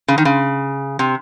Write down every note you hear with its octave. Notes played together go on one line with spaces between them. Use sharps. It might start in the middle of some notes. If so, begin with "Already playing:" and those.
C#3
D#3
C#3
C3